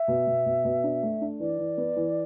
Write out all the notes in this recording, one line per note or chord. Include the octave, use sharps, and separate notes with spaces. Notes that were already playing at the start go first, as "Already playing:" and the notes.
Already playing: E5
B2
B2
B2
B2
D4
A3
D4
E3 D5
E3
B3
E3